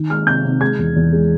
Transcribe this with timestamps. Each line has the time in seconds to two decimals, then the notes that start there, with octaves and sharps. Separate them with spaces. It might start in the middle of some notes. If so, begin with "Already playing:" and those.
Already playing: D#3
0.10 G#3 F6
0.26 C3 G6
0.45 C3
0.61 G#3 G#6
0.79 E2
0.96 E2
1.13 G#3